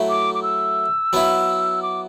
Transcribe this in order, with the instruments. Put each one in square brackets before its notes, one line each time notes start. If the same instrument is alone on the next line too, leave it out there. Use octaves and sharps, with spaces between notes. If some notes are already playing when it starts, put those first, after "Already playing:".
Already playing: [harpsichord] F#3 A3 E4
[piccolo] D6
D6
E6
[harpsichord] F#3 B3 E4
[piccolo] D6